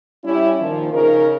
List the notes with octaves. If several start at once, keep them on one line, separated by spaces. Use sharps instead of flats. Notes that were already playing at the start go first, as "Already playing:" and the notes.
G3 C#4 E4
A#2 D#3 F3
C#3 D#4 A#4